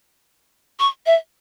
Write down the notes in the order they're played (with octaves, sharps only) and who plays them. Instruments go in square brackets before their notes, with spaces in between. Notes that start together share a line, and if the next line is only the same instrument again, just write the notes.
[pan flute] C#6
E5